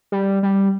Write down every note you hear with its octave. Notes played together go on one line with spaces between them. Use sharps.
G3
G3